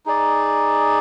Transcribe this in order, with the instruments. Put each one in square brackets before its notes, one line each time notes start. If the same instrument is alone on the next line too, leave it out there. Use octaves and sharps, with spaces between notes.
[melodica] D#4 G#4 D5